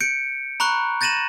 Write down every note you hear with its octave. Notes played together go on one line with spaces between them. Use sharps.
G6 C#7 D7
A#5 B5 C#6 F#6
G6 A6 A#6 D#7 E7 F#7